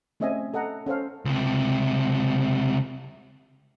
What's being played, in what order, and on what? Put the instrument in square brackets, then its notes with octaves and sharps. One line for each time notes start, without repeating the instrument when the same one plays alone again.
[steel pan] A3 C4 C#4 D#5 E5 G#5
A4 D#5 F#5 A#5
C#4 A4 C5 F5
[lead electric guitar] C#2 C3